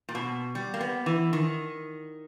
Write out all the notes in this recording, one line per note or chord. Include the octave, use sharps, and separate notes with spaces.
A#2
B2
G3
A#3
B3
E3
D#3